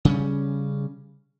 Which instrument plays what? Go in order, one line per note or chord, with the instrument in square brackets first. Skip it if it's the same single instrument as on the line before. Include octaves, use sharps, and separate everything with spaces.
[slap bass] C#3 G3 C#4